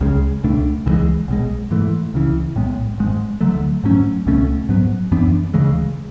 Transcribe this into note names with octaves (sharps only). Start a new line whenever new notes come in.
C#2 C#3 G#3
C#2 B2 A3 D4
C#2 C#3 E3 G#3
B1 B2 G#3
G#2 E3 A3
C#2 C#3 E3
B1 A2 G#3 B3
G#1 G#2 G#3
D2 D3 F#3 A3
G#2 F#3 A3 C#4
C#2 B2 A3 C#4
G#2 F#3 B3
F#2 E3 B3 D4
D2 C#3 E3 G#3